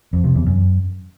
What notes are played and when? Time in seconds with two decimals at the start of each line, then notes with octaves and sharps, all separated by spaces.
0.13 F2
0.24 C3
0.35 E2
0.46 F#2